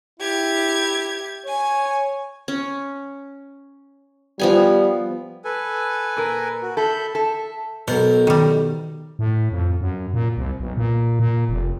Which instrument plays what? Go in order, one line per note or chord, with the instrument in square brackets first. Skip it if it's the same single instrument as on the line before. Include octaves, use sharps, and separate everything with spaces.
[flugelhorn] E4 [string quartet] G4 G#6
[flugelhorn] C#5 [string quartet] G#5
[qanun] C#4
[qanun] F3 B3 G#5 [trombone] G3
[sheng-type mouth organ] A4 B4 G#5
[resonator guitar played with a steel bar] A#2 A#4
[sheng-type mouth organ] F#4
[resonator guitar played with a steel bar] A4 [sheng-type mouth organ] E5 B5 G6
[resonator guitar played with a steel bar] A4 [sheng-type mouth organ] E5
[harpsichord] B1 A#4 C5 [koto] B2
[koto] D#3 G3
[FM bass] A2
F2
F#2
A#2
C2
B1
A#2
A#2
F1